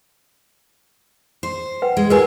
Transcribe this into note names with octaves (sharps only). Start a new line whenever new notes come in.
C5
B4 F#5 G5
G#3
F#3 E4 G#4 A#4 B4 G#5